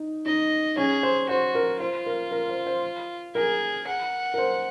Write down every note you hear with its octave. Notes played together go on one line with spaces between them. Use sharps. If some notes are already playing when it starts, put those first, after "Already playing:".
Already playing: D#4
D#4 D#5
C#4 G#4
C5
F#4 C5
A#4
F4 C5
A#4
A#4
C5
C5
G#4 A#4
F#5
A#4
C5